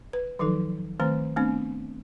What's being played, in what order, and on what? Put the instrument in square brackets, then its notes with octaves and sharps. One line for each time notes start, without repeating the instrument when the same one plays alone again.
[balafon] B4
D#3 F3 F#3 D#4 A4
D#3 A3 C4 C5 A#5
A3 B3 C4 D4